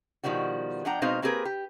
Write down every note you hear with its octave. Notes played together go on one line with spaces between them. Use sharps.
B2 D#3 F3 G3 F#4
F3 D4 F#5 G5 A#5
B2 G#3 C4 D#4 C5 F5
A#3 C4 G4 G#4 A#4 B4
G4